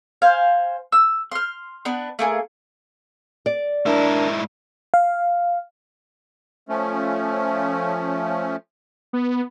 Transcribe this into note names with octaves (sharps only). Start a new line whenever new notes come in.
C5 F5 G#5
E6
C6 F6
B3 D4 B4
A3 A#3 G#4
D5
G#2 D4 E4 A#4
F5
F3 A3 C#4
B3